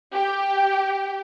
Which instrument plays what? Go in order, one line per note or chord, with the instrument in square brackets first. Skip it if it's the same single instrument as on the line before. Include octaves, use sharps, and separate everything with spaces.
[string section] G4 G5